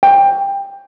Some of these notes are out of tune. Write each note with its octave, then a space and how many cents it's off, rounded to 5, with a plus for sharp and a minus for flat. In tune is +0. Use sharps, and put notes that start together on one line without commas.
G5 +20